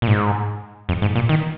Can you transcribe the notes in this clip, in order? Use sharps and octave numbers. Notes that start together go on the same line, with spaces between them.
A#2
G#2
F2
G#2
A#2
D#3